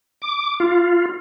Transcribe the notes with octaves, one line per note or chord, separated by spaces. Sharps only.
D6
F4